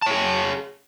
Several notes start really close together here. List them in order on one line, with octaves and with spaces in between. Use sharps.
A5 C#5 G#4